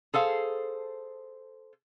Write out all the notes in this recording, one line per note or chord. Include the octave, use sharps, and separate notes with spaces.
G#4 A4 C5 F5